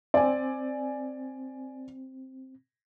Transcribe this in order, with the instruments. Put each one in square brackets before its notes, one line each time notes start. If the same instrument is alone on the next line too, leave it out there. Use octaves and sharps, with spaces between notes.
[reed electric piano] C4 [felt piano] D5 G#5